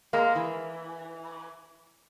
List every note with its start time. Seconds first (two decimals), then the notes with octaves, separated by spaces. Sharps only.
0.13 G#3 A#3
0.35 E3